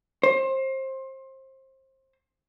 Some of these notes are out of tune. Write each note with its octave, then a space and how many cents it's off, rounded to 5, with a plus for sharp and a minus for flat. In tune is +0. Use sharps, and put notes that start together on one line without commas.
C5 +25